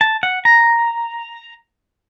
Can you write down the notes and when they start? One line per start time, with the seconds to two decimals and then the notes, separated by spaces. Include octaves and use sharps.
0.01 A5
0.23 F#5
0.45 A#5